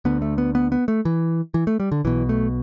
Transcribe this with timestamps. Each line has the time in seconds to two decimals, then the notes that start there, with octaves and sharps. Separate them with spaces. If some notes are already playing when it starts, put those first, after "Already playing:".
0.05 D2 D3 B3
0.22 A3
0.38 B3
0.55 B3
0.72 B3
0.88 A3
1.05 E3
1.54 E3
1.67 A3
1.80 G3
1.92 D3
2.05 B1 B2 E3
2.29 A3